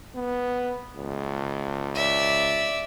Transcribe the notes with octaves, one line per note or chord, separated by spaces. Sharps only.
B3
C#2
D5 E5